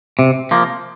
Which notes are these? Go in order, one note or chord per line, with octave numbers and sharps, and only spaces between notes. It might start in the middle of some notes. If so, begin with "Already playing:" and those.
C3
F3 A#3